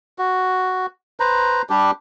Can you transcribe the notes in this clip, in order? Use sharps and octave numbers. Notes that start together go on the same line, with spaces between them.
F#4
B4 C5 A#5
G3 D4 G4